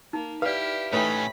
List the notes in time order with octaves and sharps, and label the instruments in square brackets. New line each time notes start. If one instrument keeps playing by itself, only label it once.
[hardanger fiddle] A#3 [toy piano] D#4
[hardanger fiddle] E4 G4 [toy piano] B4 D5 [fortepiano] F5
[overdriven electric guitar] A2 C#4 [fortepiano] A3 D#4 B4 [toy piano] C#5 G5 [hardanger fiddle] B5